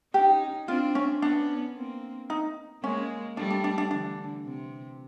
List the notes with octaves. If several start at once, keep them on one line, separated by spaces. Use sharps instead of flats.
C#4 D#4 G4
C4 D4 F4
C#4
B3 C#4 D4
A#3 C4
D#4
G#3 A#3 C#4
G3 A3 D4
D4
D4
D4
D3 E3 D4
C3